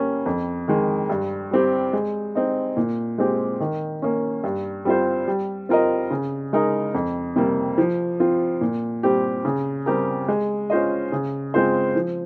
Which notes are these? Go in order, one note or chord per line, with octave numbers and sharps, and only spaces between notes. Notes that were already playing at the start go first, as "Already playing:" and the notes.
Already playing: G3 A#3 C#4
F2
D#3 G#3
G2
G3 C4 G4
G#3
C4 D#4
A#2
G#3 C4 G4
D#3
A#3 C#4
G2
G3 C4 F4 C5
G3
C4 F4 A#4 D#5
C#3
G#3 D#4 A#4
F2
C3 G3 A#3
F3
C4 F4
A#2
G3 C4 G4
C#3
G3 C4 G4 A#4
G#3
C#4 F4 C5 D#5
C#3
G#3 C4 F4 C5
F3